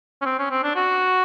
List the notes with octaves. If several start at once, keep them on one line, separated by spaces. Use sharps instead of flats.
C#4
C4
C#4
C4
D4
F#4